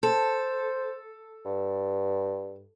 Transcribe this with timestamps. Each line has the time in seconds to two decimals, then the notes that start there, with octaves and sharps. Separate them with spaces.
0.03 A4 C5
1.45 G2